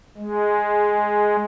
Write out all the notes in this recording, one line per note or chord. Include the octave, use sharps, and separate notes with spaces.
G#3